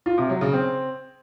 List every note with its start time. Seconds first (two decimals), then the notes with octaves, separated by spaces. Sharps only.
0.06 F4
0.18 C3
0.29 F#3
0.41 C#3
0.53 C4